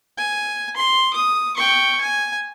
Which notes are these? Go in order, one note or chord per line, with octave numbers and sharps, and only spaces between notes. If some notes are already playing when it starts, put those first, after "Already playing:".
G#5
C6
D#6
G5 C#6
G#5